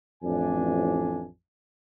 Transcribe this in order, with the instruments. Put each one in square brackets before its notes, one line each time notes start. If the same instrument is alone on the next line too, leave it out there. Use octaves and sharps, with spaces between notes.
[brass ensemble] A1 F2 D4 G#5